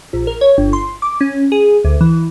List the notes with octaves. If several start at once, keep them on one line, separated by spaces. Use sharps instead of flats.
A#1
A#4
C#5
G1
C6
D6
C#4
G#4
D2
E3